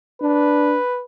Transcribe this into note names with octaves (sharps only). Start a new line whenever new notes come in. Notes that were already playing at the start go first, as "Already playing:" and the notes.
D4 B4